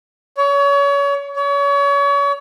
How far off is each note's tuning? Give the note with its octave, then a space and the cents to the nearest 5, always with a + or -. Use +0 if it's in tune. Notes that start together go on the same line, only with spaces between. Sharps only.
C#5 +30
C#5 +35